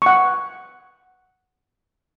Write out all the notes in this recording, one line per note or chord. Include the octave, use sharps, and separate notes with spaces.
F#5 C#6